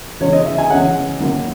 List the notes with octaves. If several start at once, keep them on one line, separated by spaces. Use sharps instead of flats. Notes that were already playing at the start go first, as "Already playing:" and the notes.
E2 C#3 G#3 C#4 C#5
D#5
E5
G#5
E2 C#3 G#3 C#4 F#5
F#2 D#3 F#3 A#3